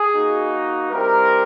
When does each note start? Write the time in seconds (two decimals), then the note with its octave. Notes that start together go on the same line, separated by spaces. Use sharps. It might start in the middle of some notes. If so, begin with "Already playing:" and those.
Already playing: G#4
0.13 A#3 D#4 F#4
0.89 G3 C4 E4 G4 A#4